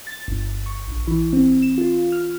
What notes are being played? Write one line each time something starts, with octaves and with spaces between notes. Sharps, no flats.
A6
G1
C#6
A#1
E3
C4
E7
F4
F6